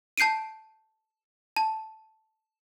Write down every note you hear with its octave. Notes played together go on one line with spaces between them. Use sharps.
A5 G6 C7 D7 D#7
A5